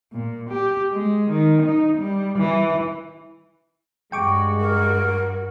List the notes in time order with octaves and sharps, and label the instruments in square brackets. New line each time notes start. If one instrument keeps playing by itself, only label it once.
[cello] A#2
G4
G#3
D#3
D#4
G3
E3
[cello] G2 F#4 [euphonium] G#3 [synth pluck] G5 C#6 D6
[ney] A#4